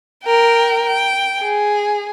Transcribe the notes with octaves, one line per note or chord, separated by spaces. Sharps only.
A#4 G5
G5
G#4